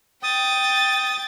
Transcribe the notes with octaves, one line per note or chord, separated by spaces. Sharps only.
G5 D#6 A6